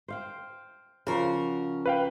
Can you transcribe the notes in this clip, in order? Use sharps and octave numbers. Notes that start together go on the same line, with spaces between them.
C5 F5 G5
C#3 F3 F#4 A#4
B4 F5 G5